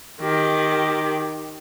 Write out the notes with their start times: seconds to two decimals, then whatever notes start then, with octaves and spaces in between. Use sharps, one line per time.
0.21 D#3 G4